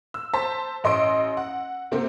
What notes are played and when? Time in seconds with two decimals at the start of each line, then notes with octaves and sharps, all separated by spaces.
0.14 E6
0.33 C5 A5 B6
0.84 A1 D#5 C6 E6 D7
1.37 F#5
1.92 C3 A3 A#3 C4